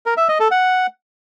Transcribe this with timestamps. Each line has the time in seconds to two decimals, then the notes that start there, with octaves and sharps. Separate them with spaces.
0.06 A#4
0.17 E5
0.29 D#5
0.40 A4
0.51 F#5